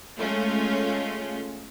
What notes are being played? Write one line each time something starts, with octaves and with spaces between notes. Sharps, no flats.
G#3 A3 C#4 F4